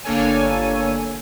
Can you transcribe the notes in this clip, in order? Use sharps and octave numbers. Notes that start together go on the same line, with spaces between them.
G1 A#3 D4 A4 C#5 G#5